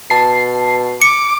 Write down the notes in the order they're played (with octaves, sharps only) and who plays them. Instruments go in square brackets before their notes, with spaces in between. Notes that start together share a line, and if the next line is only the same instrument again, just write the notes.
[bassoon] B2 [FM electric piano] A5 C7
[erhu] D6 [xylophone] C#7